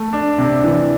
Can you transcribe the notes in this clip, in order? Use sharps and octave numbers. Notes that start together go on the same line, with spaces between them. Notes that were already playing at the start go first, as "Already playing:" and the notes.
Already playing: A3
D4
C3
E3